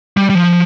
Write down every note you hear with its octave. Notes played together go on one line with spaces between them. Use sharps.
G3
G3
F3